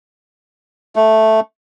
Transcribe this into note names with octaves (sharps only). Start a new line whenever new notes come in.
A3